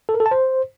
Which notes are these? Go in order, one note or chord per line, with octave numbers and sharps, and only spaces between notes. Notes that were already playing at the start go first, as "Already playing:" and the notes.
A4
A#4
A4
A5
C5